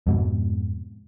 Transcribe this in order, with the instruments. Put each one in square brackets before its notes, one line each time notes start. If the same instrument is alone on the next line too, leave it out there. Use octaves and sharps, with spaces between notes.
[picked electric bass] F2 G#2 B2